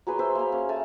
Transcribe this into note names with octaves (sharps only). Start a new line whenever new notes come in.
F#3 G#4 B4 C6
C5 E5 C6
A#3 F5
C#4
A3 G#5 A5